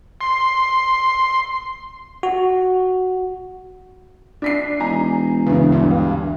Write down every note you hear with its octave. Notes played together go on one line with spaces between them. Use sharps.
C6
F#4
D4 B6 C7
E1 D#4 G#5 A#5
D2 C#3 E3
G2
F5